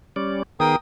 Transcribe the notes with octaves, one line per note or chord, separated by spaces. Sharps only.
G3 C#4 D5
D#3 B3 G#4 A#4 G5 D#6